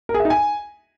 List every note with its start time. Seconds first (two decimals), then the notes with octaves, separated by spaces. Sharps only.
0.09 A#4
0.14 G#4
0.20 E5
0.25 D#4
0.30 G#5